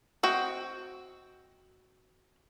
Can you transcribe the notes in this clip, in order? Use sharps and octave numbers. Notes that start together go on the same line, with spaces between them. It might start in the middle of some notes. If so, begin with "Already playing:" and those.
C4 F#4 D#5 G5